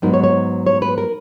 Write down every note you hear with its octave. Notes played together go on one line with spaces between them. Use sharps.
G#2 F#3 B3 D#4 A#4
C#5
C#5
C#5
B4
A#4